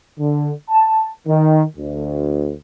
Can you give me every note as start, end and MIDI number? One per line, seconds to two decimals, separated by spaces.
0.20 0.51 50
0.70 1.09 81
1.28 1.63 51
1.77 2.54 38